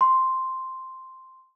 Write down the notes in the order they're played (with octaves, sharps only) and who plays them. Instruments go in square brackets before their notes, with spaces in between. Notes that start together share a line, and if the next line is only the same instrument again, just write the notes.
[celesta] C6